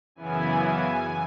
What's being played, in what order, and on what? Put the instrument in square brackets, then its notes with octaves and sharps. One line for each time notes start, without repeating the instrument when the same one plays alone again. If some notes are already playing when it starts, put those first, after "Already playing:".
[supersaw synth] F#2 C#3 E3 B3 E4 G#5